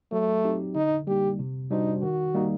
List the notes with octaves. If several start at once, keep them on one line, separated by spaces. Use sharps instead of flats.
F#3 A3
C4 D#4 G4
D3 D#4
G3 A#3 D#4 G4
C3
G3 D4 D#4 F#4 C5
D#3 F#4
G3 A#3 D#4